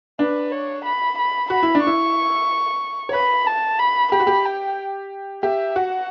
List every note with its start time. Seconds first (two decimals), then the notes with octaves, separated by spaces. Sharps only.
0.19 D4 B4
0.52 C#5
0.85 B5
1.18 B5
1.50 F#4 B5
1.63 E4
1.75 D4
1.83 E4 C#6
3.09 C#5
3.13 B4 B5
3.46 A5
3.79 B5
4.12 G4 B5
4.20 F#4
4.27 G4
4.45 G5
5.43 G4 E5
5.75 F#4 F#5